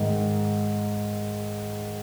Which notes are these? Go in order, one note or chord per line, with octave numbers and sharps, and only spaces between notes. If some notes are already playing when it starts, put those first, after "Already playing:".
Already playing: G#2 D#3